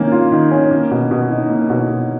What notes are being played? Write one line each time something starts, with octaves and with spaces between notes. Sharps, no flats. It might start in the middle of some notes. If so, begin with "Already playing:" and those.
Already playing: D#3 A#3 C#4
F4
D#3
C#4
A#3
B2
B2
D#4
A#3
B2
B2